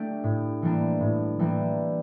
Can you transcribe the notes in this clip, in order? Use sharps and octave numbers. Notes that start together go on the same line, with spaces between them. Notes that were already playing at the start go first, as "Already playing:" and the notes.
Already playing: A3 D4 G4
A2
E3 G3 A#3 D4
A2
E3 G3 A#3 D4